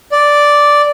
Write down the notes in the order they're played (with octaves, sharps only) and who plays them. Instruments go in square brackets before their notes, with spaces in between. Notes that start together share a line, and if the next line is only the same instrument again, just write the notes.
[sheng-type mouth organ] D5